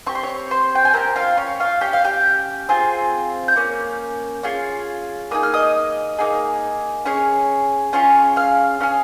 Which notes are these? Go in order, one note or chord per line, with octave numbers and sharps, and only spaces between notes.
C4 G4 C#6
C6
C#5 C#6
C5 C6
G5
G#5
C4 G4 A#4 A#5
F4 F5
C#4 C#5
F4 F5
C#4 G4 G5
F5
G4 G5
C4 F4 G#4
G6
A#3 C#4
C#4 F4 G#4
A#3 D#4 G#4 D#6
F6
D#5 D#6
A#3 D#4 G#4
C#4 G#4 C#5 C#6
C#4 F4 G#4 C#5 C#6
F5 F6
C#4 G#4 F5 F6